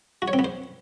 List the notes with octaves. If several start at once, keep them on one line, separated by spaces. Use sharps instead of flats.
F#4
C#5
C4
B3
C5